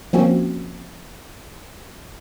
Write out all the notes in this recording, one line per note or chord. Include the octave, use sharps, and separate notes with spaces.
F3 A#3 C4 C#4 F#4